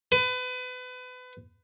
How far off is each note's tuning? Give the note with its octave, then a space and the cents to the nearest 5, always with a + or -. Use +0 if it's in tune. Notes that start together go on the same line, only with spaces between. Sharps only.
B4 +30